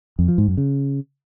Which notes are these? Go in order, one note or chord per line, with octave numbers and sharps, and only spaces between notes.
F2
F3
G#2
F#2
C#3